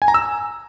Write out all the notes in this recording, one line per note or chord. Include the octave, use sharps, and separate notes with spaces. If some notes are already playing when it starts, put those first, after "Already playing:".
G#5
A#5
E6